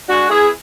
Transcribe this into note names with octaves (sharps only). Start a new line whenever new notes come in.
G#3 D4 F#4
B3 E4 G#4